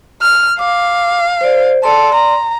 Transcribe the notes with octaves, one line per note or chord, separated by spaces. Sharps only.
F6
F5 D6
C5 D5
A4 D5 C6
A#5